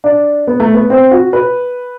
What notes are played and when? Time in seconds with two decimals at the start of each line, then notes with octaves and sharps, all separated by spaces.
0.04 D4
0.47 B3
0.60 A3
0.74 B3
0.90 C4
1.11 F#4
1.33 B4